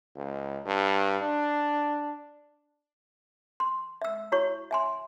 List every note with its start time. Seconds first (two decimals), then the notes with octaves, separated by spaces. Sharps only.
0.16 C#2
0.66 G2
1.22 D4
3.60 C6
4.02 E5 E6
4.32 E4 F#4 C#5 C#6
4.71 E5 G#5 C6